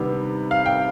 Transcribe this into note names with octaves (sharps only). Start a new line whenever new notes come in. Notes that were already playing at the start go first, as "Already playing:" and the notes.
Already playing: C3 D#3 G3 B3 D4
F5
G5